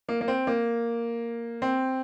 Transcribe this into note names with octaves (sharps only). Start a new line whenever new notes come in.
A#3
A#3
C4
A#3
C4